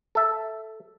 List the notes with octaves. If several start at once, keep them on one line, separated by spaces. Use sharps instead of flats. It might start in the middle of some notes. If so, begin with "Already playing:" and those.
A4 E5